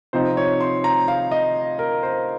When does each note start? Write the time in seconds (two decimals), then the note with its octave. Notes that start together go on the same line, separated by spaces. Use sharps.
0.13 C3 F3 C4 D#4 C5
0.37 C#5
0.60 C6
0.84 A#5
1.08 F5
1.31 D#5
1.79 A#4
2.03 C5